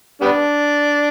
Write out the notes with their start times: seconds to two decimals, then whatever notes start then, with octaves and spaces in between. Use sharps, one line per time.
0.21 G3 B3 D4